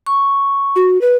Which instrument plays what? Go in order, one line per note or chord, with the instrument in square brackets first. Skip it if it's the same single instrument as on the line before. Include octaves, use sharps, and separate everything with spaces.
[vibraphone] C#6
[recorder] F#4
B4